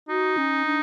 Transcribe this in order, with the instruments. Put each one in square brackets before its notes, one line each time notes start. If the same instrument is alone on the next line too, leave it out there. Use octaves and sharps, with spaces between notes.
[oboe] D#4 [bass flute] F#4
[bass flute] C#4
D4